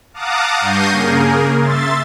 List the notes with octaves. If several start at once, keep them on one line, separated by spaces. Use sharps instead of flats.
F5 F#5 A5 A#5 D6 D#6
G2 C#6 G6 A#6 C7 D#7
C#3 A#3 G#4 A#4
E5 C6 A6